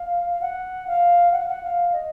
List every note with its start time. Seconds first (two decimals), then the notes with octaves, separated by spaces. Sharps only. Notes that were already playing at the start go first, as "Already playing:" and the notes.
Already playing: F5
0.31 F5
0.41 F#5
0.87 F5
1.32 F#5
1.40 F5
1.48 F#5
1.63 F5
1.93 D#5